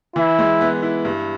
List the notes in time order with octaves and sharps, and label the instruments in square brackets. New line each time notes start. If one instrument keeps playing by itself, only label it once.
[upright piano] E3 [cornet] E4
[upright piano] G#3
B3
E4
G2